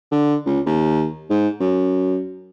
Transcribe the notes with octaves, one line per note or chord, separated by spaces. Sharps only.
D3
C#2
D#2
G#2
F#2